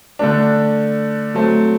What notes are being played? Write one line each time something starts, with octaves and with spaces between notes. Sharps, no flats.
D3 A3 D4
F#3 A3 C4